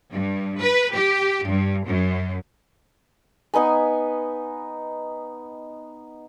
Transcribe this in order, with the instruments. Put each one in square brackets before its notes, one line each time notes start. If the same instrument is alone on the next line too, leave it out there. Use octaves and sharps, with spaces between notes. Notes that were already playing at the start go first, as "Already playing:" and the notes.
[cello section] G2
B4
G4
G2
F#2
[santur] B3 D#4 B4 G#5